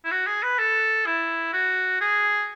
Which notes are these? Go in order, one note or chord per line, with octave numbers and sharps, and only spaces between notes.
E4
F#4
G#4
B4
A4
E4
F#4
G#4